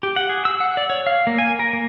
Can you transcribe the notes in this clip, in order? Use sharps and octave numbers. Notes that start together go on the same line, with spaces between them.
G4
F#5
G#4
E6
F#5
D5
C#5
F5
A#3
G#5
A#4
A#3